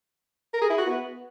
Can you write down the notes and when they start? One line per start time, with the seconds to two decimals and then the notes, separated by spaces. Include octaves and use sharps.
0.53 A#4
0.62 G#4
0.70 E4
0.78 F#4
0.86 B3